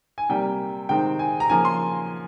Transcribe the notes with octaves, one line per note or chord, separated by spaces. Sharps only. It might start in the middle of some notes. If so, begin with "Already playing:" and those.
G#5
C3 G3 A#3 G5
C3 D#3 G#3 C4 G5
G#5
A#5
C#3 F3 A#3 G#5
C6